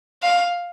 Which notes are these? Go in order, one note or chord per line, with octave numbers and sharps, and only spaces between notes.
F5